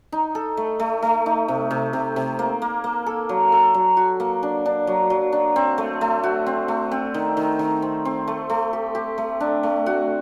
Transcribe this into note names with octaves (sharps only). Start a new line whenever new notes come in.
D#4
A4
A3
A3
A3
D#4
C3
C3
C3
C3
A#3
A#3
A#3
A4
F#3
A4
F#3
F#4
A#3
D4
D4
F#3
F#3
D4
C4
A3
A3
F#4
C4
A3
C4
D#3
D#3
D#3
C4
C4
A3
A3
G4
G4
A3
D4
A3
F#4